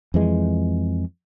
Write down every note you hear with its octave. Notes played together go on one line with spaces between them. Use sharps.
F2 E3 G#3